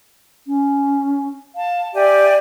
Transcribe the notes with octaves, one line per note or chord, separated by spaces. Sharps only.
C#4
F5 A5
G4 D5 E5 G#5